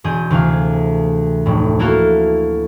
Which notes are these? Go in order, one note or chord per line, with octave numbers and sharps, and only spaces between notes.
E1 G#4 G6 D#7
D2 C3 E3 F5
F1 A2
A#3 E4 F#4 A4 A#4 F5